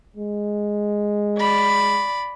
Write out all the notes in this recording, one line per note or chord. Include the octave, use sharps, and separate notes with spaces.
G#3
D5 B5